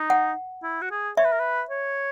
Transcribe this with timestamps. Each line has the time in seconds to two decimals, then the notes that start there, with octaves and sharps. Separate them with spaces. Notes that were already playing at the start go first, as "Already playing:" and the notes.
Already playing: D#4
0.10 F#5
0.63 E4
0.81 F#4
0.91 G#4
1.17 C#5 E5
1.24 B4
1.32 A#4
1.39 B4
1.70 C#5